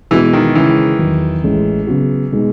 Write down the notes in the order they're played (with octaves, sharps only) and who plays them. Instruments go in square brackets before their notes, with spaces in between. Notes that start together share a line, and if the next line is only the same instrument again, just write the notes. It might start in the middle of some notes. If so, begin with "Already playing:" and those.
[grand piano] B2 G#3 B3 F#4 [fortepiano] E3
[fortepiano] D#3
[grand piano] C#3 G#3 C#4 E4 [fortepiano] E3
[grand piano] E2 D#3 F#3
A1 A2 G#3 C#4
C#3 F#3 B3 F#4
B2 G#3 D#4